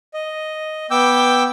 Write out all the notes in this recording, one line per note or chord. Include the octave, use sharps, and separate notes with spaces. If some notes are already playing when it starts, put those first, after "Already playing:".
D#5
B3 G5 D6 E6 G6